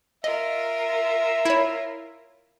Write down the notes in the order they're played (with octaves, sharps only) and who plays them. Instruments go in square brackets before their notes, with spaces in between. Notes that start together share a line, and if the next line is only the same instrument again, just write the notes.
[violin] F4 A#4 [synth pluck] D#5 [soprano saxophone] E5
[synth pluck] E4 C#5